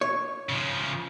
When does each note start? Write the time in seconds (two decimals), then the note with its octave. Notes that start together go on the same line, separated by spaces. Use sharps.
0.01 C#5
0.49 C#3 F3